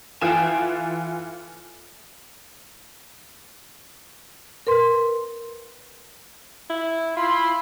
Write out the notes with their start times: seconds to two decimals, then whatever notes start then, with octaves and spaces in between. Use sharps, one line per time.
0.21 E3 F4 A4 G5 G#5 E7
4.67 A#4 B4 C6
6.70 E4
7.17 E4 F4 B5 C6